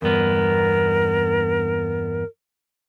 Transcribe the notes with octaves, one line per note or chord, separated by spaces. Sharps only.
E2 G2 B3 A#4